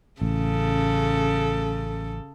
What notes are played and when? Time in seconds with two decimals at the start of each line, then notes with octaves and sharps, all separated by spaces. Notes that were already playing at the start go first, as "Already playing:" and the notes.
0.22 A1 C#3 A4